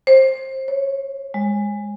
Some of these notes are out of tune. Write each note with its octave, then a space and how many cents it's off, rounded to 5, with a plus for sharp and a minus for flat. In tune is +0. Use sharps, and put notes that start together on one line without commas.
C5 +20
C#5 -15
G#3 -15